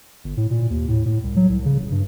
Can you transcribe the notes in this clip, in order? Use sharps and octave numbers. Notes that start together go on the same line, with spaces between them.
G1
A2
A#2
D#2
A2
A2
C2
F#3
C2
C#3
D#1
G2